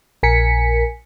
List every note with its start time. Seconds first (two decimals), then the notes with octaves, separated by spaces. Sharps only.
0.23 A#1 A#4 G#5 B6 C#7